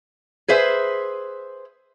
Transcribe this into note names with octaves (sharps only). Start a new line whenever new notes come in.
G#4 B4 C5 E5